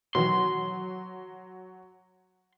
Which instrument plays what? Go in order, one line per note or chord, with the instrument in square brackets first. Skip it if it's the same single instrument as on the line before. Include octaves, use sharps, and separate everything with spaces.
[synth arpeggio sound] B2 D#3 E3 [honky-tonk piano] F#3 [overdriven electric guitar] C6